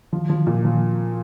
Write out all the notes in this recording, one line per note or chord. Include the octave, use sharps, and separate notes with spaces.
F3
F3
A#2
F3